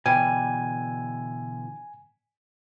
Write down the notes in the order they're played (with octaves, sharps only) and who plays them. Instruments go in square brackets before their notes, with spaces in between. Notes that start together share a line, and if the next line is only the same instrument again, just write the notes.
[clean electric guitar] B2 D3 E3 [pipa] G3 [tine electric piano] G#5